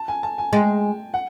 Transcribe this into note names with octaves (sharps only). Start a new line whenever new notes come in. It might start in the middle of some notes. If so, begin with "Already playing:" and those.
Already playing: A5
G#5
A5
G#5
G#3 G5
F#5